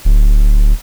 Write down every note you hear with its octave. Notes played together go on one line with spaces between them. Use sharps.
D1